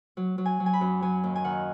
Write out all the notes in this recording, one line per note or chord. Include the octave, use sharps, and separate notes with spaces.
F#3
F#3
G#5
F#3
G#5
B5
F#2
F#3 G#5
D#2
G#5
D#3 F#5